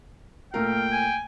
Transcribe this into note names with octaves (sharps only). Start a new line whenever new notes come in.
A#2 A3 A#4 F5 G5
G#5